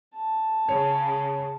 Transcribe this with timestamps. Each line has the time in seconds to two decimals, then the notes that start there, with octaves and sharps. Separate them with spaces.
0.14 A5
0.69 C#3 C#5